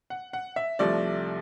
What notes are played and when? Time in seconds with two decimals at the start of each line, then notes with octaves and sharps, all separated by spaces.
0.10 F#5
0.33 F#5
0.56 E5
0.79 C2 C3 F3 A3 D5